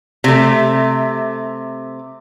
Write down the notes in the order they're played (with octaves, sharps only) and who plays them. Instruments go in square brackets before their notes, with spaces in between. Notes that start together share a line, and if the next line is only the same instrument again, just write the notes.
[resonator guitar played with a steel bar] C3 A3